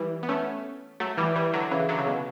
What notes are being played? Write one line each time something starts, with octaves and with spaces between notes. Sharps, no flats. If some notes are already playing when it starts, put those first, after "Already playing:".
Already playing: E3 G3
B3
A3 C#4
F#3 A3
E3 G3
E3 G3
D3 F#3
C#3 E3
D3 F#3
C#3
B2